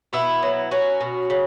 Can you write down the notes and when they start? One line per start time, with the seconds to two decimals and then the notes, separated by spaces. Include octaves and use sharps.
0.13 B2 B3 E4
0.43 F#3
0.71 F#3 C#4 F#4
1.01 B2
1.30 C#3